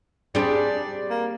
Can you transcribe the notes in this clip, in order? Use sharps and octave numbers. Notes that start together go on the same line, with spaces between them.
G3 C4 D4 G4 G#4 D5
A#3